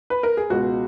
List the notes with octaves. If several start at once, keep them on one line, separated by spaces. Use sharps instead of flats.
B4
A#4
G#4
C#2 B2 G#3 F#4